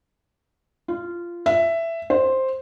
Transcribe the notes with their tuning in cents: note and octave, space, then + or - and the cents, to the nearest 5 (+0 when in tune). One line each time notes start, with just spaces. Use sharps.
F4 -15
E5 +10
C5 +5